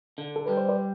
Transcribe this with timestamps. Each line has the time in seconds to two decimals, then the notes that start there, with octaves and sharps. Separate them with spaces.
0.18 D3
0.36 A4
0.46 G3 B4
0.57 C5
0.69 B4 D5